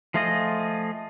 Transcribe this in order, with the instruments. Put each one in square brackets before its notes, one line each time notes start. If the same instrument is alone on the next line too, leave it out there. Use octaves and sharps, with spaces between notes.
[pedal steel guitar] F3 A3 F4 G#4 D#5